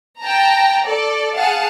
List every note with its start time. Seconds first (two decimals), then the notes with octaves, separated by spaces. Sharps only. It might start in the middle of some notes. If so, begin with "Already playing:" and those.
0.21 G5 A5 A#5
0.85 A4 D5
1.36 G#4 F5 F#5 A5